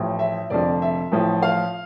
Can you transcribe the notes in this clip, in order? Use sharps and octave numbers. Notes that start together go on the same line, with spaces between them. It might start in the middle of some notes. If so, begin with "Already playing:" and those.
Already playing: A1 A2 F3
E5
F1 F2 D3 F3 D5
E5
A1 A2 F3
F5